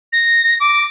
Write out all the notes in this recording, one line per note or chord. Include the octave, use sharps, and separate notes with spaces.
A#6
D6